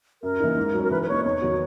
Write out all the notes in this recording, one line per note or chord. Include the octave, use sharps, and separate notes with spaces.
F#2 A#4
E3 A#3 D#4
G#2
F#3 C#4
A#4
E3 B4
B4
A#3 D#4 C#5
E2 C#5
D#3 F#3 B3 F#4